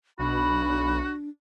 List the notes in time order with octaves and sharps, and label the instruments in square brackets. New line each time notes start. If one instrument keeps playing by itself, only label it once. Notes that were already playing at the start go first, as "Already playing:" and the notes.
[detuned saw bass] B1 [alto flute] D4 [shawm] F#4 [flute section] B5